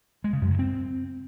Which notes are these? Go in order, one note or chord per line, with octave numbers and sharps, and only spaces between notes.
G#3
C#3
F#2
G2
C4